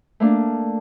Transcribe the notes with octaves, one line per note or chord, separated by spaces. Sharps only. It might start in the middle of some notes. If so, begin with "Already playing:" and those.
A3 A#3 D4